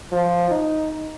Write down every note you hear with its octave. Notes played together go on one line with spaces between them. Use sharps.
F3
D#4